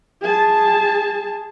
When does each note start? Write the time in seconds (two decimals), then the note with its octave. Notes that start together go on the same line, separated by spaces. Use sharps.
0.21 G#4 A5